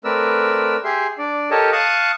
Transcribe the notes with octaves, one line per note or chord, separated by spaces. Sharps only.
A3 C4 A#4 B4 D5 E6
G4 G#4 E5 C6
D4 D5
G4 A4 A#4 C#5 D#5 A5
F5 A5 C#6 D#6 F#6